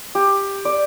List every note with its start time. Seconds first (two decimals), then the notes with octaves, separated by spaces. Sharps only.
0.15 G4
0.65 D5